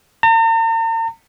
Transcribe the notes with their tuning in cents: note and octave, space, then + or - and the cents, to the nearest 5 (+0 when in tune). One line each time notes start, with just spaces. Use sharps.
A#5 -45